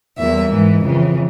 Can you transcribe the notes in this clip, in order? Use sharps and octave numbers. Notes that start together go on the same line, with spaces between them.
E2 E3 G3 A#3 E5
G#2 E3 G#3
F2 C#3 E3